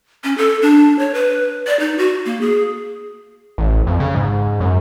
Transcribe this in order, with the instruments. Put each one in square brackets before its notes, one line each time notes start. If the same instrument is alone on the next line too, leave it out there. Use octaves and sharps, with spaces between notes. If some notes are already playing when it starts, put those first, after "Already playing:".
[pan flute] C#4
A4
D4
C#5
B4
D5
D#4
F#4
A#3
G#4
[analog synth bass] A1
F2
C#3
G#2
F#2